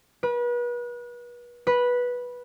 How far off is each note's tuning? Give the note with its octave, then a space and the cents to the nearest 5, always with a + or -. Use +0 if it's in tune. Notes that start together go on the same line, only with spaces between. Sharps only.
B4 -35
B4 -10